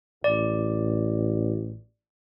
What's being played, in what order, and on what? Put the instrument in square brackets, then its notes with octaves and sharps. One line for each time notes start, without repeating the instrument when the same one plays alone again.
[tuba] A1 [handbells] D5